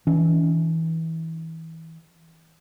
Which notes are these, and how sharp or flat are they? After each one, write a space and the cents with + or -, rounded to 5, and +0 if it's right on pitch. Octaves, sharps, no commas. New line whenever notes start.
E3 -25 C#4 +40